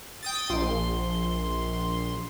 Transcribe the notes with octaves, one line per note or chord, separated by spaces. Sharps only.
G5 D#6 A6
A#1 C6